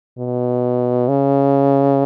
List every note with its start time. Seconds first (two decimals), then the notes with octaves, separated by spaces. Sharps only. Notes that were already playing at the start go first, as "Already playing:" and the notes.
0.18 B2
1.08 C#3